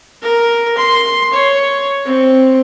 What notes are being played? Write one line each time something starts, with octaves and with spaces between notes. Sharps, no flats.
A#4
C6
C#5
C4